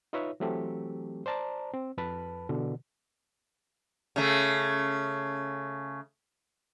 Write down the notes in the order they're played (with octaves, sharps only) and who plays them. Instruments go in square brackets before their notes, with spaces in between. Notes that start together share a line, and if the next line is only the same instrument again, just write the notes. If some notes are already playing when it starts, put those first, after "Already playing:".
[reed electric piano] D#4 F4 B4 C#5 E5
E3 F#3 A3 C4 G4 A4
C5 D5 A5 A#5
C4
F2 B4 A5 B5
B2 D3 E3
[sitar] C#3 A3